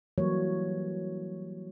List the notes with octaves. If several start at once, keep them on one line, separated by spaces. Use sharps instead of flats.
E3 F#3 G3 A#3 C#5